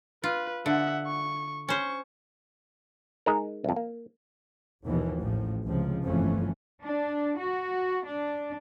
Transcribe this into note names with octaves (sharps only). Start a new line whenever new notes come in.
F4 B4
D3 E5 F#5
C#6
C#4 C5 C#6
G#3 D#4 A#4
C2 F2
A#3
G1 D#2 B2 E3 F3
A1 A2 F3
C#2 C3 F3
G1 F2 E3 F3 A3 C#4
D4
F#4
D4